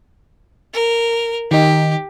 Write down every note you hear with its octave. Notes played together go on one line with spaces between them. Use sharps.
A#4
D#3 D#4 G4